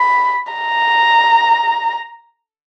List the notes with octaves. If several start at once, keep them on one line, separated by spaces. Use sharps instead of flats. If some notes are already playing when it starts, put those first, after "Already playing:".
Already playing: B5
A#5